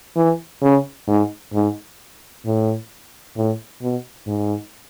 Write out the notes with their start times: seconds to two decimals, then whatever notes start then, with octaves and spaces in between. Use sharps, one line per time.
0.16 E3
0.62 C#3
1.08 G#2
1.53 G#2
2.45 A2
3.36 A2
3.82 B2
4.27 G#2